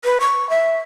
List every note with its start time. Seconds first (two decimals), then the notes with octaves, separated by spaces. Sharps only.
0.05 B4
0.20 C#6
0.50 E5